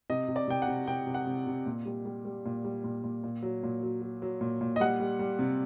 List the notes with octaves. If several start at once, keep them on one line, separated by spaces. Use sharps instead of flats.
C3 D#5
C3
D5
C3 G5
F#5
C3
C3 G5
C3
F#5
C3
C3
A#2
G3
G3
G3
A#2
G3
A#2
A#2
A#2
F#3
A#2
F#3
F#3
F#3
A#2
A#2
D#5
G3 F#5
G3
G3
C3